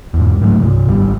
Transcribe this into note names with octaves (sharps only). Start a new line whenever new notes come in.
E2 G#2
G#2 F#3 A3
G2 C3
G#1 G3